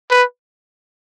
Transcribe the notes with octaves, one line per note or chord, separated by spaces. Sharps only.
B4